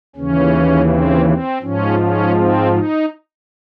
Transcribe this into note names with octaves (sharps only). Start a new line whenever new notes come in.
D#2 C#3 E3 C#4
C4
C4
G#2 F3 C#4
C#4
C4
D#4